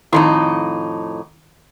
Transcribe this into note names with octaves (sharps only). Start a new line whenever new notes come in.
F2 A2 D#3 D#4 E4